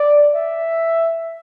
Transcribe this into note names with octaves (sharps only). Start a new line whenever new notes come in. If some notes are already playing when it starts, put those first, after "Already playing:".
Already playing: D5
E5